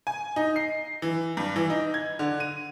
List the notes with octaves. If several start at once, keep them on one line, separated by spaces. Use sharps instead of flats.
G#5
D#4
C7
E3
G2
E3
D#4
G#6
D3
D#7